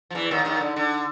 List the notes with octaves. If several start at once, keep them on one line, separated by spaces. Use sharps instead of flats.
F3
E2 E3
D#2 D#3
D#2 D#3
D3
D3